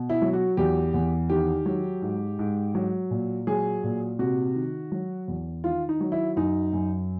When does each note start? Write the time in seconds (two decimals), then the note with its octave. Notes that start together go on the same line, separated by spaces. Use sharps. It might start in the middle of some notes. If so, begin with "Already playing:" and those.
Already playing: B2
0.10 E4
0.22 F#3
0.33 F#4
0.57 E2 G4
0.94 E2
1.30 D#3 G4
1.66 F#3
2.02 G#2
2.39 G#2
2.75 F#3
3.11 A#2
3.47 F#3 G#4
3.84 A#2
4.19 C3 F#4
4.55 D#3
4.92 F#3
5.28 E2
5.64 D#3 F4
5.89 D#4
6.01 F#3
6.12 E4
6.36 F#2 D#4
6.73 F#2